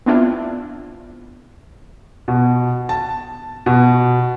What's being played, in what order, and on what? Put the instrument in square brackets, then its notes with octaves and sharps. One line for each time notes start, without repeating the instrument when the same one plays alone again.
[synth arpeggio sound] B3 C4 D4 E4 F4
[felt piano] B2
A5
B2